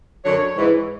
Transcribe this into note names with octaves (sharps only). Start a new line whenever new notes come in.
F#2 D3 F#3 C#5
G#2 E3